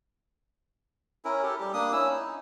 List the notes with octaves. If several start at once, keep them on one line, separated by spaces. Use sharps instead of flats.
C#4 E4 A#4
G4 A4
G3 G4
A#3 D4 D#6
C#4 E4 E6
D#4